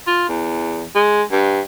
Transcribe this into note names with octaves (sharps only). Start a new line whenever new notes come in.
F4
E2
G#3
G2